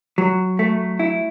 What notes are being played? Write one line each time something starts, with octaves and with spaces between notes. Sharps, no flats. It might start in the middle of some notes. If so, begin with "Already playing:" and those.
F#3
A3
E4